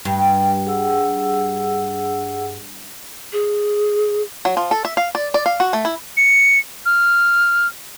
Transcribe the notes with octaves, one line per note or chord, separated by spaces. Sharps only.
G2 G5
G#4 F#5 E6
G#4
F#3
F3
A4
E5
F5
D5
D5
F5
F#4
A3
E4
C#7
F6